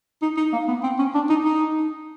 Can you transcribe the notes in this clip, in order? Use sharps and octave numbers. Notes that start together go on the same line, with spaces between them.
D#4
D#4
A#3
B3
C4
C#4
D4
D#4
D#4